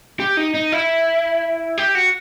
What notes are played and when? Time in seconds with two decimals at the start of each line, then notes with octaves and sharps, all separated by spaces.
0.20 G4
0.37 D#4
0.54 D#4
0.72 E4
1.78 G4
1.95 F#4